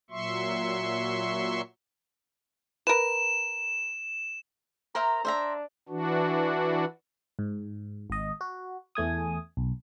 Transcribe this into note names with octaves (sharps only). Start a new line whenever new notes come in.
A#2 F#3 E5 C6 C#6
A#4 B4 E7
A#4 C5 E5 A#5
D4 C5 E5 A#5
E3 D4 F#4
G#2
G#1 D#5
F#4
E2 A3 G#5 D#6
B1